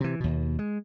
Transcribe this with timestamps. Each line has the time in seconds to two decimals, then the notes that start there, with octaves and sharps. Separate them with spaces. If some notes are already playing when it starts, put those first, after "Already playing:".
0.01 C3 E3
0.20 D#2 B2
0.59 G#3